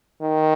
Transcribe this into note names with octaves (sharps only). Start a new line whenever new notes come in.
D#3